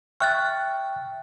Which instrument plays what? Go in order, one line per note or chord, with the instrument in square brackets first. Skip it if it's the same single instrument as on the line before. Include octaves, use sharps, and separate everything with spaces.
[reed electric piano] E5 G5 C#6 [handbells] F6 F#6 A6